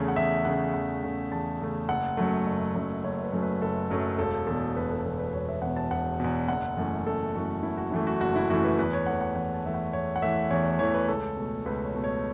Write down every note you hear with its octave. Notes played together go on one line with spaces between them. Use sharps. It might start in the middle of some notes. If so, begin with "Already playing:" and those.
Already playing: E2 C#3 A3 C#5
F#5
E2 E5
C#3 A3 F#5
E2 F#5
C#3 A3 F#5
E2 A5
C#3 A3
F#1 F#5
F#2 F#3 A3
F#1
F#2 F#3 A3
F#1 C#5
B4
F#2 F#3 A3
B4
F#1 A4
F#2 F#3 A3
E1 A4
E2 B2 A4
E1 B4
A4
E2 B2 A4
B4
E1 C#5
E5
E2 B2 F#5
A5
E1 F#5
E2 B2
F#1 F#5
F#2 E3 A3
F#1 A4
F#2 E3 A3 F#4
F#1 E4
F#4
F#2 E3 A3 E4
F#4
F#1 F#4
E4
F#2 E3 A3 F#4
B4
E2 B4
C#5
E3 A3 F#5
F#5
E2 F#5
A5
E3 A3 E5
F#5
E2 C#5
F#5
E3 A3 E5
E2 C#5
C#5
E3 A3 C#5
B4
C#2 A4
B2 A3
C#2 B4
C#5
B2 A3
C#5